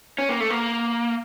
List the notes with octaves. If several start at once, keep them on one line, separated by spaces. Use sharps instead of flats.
C#4
A#3
A3
A#3